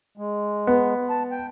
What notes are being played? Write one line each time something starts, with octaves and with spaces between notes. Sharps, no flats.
G#3
B3
A5
G5